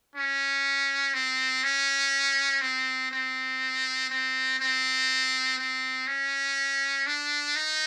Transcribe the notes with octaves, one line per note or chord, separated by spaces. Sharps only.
C#4
C4
C#4
C4
C4
C4
C4
C4
C#4
D4
D#4